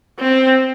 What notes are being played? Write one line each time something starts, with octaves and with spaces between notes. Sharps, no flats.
C4